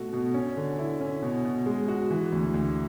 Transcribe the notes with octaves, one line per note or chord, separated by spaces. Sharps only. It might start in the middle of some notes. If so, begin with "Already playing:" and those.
Already playing: B2 A3 F#4
B2
C#4
D3
E4
C#4
B2
B2
G#3
F#4
E3
D2
D2